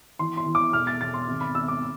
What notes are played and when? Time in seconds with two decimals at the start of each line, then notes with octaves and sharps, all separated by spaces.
0.19 E3 C6
0.37 C6
0.46 E3
0.55 D6
0.73 E1 F6
0.87 A6
1.01 E1 A6
1.14 C6
1.28 G#1
1.41 B5
1.55 G#1 E6
1.68 D6